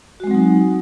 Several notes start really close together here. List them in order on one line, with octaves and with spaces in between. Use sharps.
F#4 G#3 C4 F#3 D#4